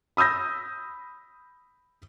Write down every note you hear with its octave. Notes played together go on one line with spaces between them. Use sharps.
B5 D#6 E6 G6 A#6